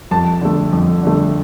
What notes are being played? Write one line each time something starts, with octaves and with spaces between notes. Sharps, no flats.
F2 A5
D3 A3
F2
D3 A3